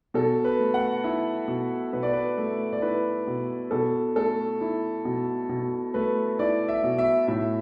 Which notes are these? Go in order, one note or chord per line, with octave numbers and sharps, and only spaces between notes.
B2 A4
B4
A3
F#5
E4 E5
B2
B2 B4
D5
B4
A3
D5
E4 B4
B2
B2 A4
A3 A4
E4
B2
B2
A3 B4
E4 D5
E5
B2
E5
A2 E5